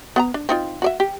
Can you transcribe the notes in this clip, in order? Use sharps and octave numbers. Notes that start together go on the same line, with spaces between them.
B3 F#5 A#5
D4
C4 D#4 F4
F#4 D5 E5
G4